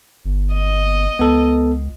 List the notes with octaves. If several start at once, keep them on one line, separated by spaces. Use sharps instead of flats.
G1
D#5
C#2 B3 A4